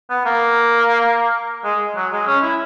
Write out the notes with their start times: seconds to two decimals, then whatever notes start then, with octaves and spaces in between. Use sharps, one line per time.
0.10 B3
0.25 A#3
1.64 G#3
1.96 F#3
2.12 G#3
2.27 C#4
2.43 E4